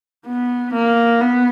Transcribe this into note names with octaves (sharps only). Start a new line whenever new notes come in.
B3
A#3
B3